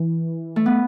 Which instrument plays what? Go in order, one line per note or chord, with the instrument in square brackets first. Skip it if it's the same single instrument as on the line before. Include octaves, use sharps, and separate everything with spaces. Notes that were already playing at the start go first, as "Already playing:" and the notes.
Already playing: [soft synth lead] E3
[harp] A3
B3